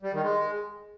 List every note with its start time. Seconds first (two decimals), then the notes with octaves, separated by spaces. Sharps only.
0.02 G3
0.13 D#3
0.23 G#3